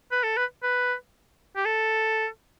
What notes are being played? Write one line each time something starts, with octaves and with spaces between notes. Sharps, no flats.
B4
A4
B4
B4
G4
A4